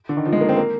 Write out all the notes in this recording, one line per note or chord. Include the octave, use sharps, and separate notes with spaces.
D3
D#3
F3
G#3
A#3
C4
A#3